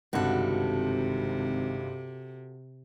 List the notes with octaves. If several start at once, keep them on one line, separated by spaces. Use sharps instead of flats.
G#1 C#2 G2 C3 F#4 A4